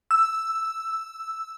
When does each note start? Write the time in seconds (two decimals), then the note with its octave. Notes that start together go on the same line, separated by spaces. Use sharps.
0.11 E6